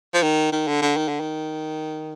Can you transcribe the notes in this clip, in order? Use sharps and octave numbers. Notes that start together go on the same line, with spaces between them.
F3
D#3
D#3
D3
D3
D#3
D3
D#3